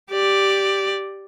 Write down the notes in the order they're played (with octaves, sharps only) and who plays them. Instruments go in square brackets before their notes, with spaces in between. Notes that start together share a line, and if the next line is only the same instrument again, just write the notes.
[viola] G4 D5